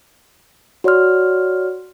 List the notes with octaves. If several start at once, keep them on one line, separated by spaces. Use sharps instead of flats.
F#4 C#5 D5 C6 F6